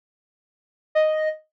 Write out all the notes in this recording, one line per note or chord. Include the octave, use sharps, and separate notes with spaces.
D#5